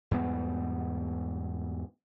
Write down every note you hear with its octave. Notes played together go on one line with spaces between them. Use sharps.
E2 G#2 G3 B3